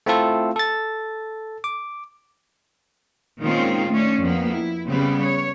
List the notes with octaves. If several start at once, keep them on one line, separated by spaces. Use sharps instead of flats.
A3 C4 E4 F4 A4
A4 A6
D6
A#2 D#3 G#3 C4 C#4 F4
A3 C#4 D4
F2 A#3 B3
E4
C#3 G3 B3 C4
C#5